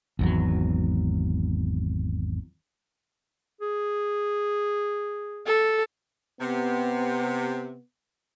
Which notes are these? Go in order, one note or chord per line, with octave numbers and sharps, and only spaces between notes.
G#1 E2 F#3
G#4
A4
C3 B3